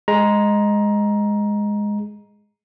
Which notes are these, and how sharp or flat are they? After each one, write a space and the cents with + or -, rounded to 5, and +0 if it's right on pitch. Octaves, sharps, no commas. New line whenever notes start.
G#3 +0 A#5 +15